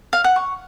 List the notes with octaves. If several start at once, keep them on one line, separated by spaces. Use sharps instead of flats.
F5
F#5
C#6